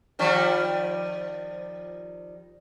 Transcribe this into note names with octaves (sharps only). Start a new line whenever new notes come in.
D#3 F3 G3